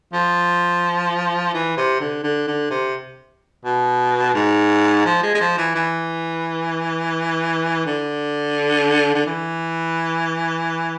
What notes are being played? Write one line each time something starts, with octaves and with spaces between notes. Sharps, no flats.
F3
E3
C3
D3
D3
D3
C3
B2
G#2
F3
G#3
G#3
F3
E3
E3
D3
D3
E3